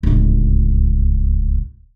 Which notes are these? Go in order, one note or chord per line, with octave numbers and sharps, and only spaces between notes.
D1 C#2